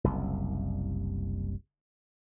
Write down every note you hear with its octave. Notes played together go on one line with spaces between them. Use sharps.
F#1 C2